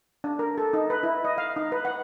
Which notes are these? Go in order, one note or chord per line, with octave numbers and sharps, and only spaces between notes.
D4
A#4
A4
D#4
B4
E4
D#5
F5
D#4
B4
F#5